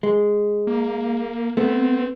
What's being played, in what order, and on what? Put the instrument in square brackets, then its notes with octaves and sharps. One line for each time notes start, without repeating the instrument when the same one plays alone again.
[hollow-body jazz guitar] G#3
[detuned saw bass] A#3
[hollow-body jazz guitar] A3 B3 [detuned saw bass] C4